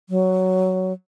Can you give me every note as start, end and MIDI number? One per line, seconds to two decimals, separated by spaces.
0.09 0.93 54